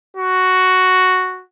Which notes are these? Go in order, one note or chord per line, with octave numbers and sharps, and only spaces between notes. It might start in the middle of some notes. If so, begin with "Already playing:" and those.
F#4